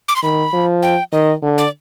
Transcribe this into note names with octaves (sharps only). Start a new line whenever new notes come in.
D6
C6
D#3 B5
F3
G5
D#3 D#5
D3
D5